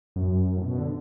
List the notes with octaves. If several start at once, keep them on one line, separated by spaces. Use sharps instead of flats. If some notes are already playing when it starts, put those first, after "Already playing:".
F#2
A2
B2
D3